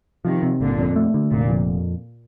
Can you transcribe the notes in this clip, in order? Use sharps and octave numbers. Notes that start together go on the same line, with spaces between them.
C3 D#3 F3
C3
G1 A#2 D3
F2
A3
D3
F1 A#2
F2